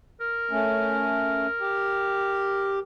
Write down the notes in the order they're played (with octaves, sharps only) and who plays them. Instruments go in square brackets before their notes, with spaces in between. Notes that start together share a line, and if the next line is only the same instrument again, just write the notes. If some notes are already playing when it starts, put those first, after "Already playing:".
[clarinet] A#4
[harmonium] A3 C#4
G4